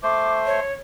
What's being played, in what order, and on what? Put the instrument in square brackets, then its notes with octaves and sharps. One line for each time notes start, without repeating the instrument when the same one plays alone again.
[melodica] A3 C5 [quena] D6
[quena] C#5